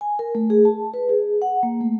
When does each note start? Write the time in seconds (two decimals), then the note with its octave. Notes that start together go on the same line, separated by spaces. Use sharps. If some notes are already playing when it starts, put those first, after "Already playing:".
0.01 G#5
0.19 A#4
0.35 A3
0.50 G#4
0.65 A5
0.94 B4
1.09 G#4
1.42 F#5
1.63 A#3
1.81 A3